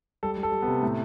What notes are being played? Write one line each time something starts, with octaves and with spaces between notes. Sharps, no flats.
G3 A4
G3
A4
G3
B3
C3
A2 A3